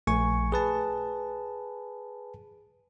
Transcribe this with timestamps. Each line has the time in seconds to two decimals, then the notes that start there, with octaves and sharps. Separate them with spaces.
0.07 A#1 A3 G#5 C#6
0.52 G#4 B4 A5